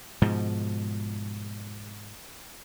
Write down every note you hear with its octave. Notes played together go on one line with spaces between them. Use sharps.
G#2 B2 F3